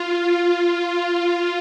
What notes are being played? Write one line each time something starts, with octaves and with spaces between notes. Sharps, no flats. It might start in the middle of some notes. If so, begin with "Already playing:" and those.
Already playing: F4